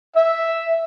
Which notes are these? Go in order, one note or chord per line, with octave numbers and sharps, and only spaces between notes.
E5